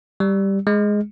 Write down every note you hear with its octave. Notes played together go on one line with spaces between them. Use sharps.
G3
G#3